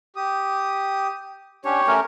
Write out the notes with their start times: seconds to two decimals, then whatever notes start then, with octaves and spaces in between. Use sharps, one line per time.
0.16 G4 D#6
1.65 C#4 D4 G4 C#5
1.87 A3 C#4 A#4